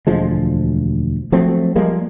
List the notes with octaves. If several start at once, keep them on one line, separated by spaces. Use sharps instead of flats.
E1 D2 F3 G#3
F3 F#3 A3 C4
F3 G3 G#3 A#3